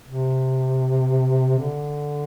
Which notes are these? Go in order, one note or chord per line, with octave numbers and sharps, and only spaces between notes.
C3
D3